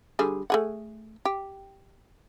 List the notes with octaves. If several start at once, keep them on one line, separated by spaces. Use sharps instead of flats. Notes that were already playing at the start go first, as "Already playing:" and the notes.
D3 G3 G#4
A3 G#4 F#5
G4